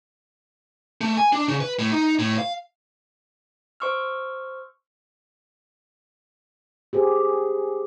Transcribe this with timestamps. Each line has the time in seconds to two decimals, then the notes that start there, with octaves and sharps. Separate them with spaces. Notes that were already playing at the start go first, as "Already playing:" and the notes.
1.01 A3
1.17 G#5
1.33 D4
1.48 C#3
1.60 B4
1.79 A2
1.92 D#4
2.19 A2
2.38 F5
3.80 C5 C6 C#6 E6 F6
6.93 G4 G#4 C5